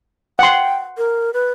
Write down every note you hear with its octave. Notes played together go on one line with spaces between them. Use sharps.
F#5 G5 C6
A#4
B4